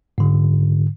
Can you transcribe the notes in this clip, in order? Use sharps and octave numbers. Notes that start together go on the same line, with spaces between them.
G#2 D3